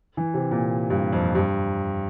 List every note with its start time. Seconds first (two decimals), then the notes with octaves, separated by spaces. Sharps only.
0.17 E3
0.34 C3
0.51 A#2
0.90 G2
1.13 F2
1.35 G2